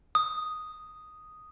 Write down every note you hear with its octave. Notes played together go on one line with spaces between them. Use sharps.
D#6